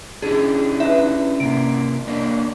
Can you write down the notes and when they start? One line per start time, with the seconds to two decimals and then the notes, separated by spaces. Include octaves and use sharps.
0.22 C#4 D4 E4 G4 G#4
0.80 D#4 B4 E5
1.40 C3 A#3 D7
2.07 A#3 D4 D5 D#5